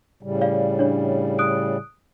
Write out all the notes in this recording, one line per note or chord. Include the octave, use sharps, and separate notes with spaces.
A2 C#3 G3
D5 F5
D4 C#5
D#6 F#6 D7